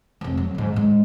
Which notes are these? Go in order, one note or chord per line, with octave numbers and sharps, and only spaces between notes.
F1 C2
F#3
G#2 D3
A2 G#3